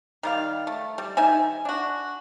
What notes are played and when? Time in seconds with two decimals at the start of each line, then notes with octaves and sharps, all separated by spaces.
0.23 D#3 G3 F5
0.67 A3
0.98 G3
1.17 D#3 D#4 E5 G#5
1.65 D4 F#4